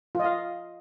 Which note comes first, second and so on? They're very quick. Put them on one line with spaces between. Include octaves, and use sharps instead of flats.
F4 D#5 F5